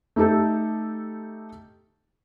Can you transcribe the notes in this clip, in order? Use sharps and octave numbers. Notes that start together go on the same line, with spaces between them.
A3 D#4 G4 A4